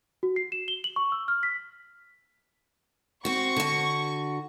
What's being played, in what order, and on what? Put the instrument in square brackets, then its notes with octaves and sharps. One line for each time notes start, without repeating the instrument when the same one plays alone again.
[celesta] F#4
C7
E7
G7
F#7
C#6
E6
F6
B6
[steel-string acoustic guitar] C4 F#4 [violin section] C#6
[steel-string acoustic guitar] D3 F#4